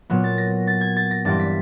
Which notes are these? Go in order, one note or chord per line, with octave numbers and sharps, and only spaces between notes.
A#2 F#3 B3
A6
A#6
A6
G#6
A6
A#6
G2 E3 G3 C4 A6
B6